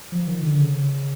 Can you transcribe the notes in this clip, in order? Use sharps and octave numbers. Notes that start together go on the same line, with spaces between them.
F3
D#3
D3
C#3